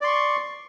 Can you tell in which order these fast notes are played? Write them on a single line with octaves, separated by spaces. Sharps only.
D5 C6 C#6